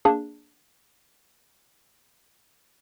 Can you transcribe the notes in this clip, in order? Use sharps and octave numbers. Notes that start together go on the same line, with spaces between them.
A#3 D4 G#4